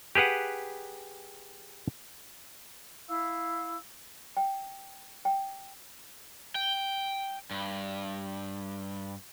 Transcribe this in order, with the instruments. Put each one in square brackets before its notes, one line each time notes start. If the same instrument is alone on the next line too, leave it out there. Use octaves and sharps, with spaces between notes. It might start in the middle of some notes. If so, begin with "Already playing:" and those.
[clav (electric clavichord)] G4 G#4 B4 F#5
[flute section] E4 F5 E6
[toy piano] G5
G5
[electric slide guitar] G5
G2